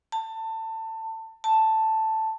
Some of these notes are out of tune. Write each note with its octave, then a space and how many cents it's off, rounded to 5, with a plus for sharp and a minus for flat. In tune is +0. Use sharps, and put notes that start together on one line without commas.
A5 +25
A5 +5